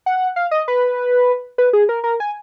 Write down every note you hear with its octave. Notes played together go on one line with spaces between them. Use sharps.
F#5
F5
D#5
B4
B4
G#4
A#4
A#4
G#5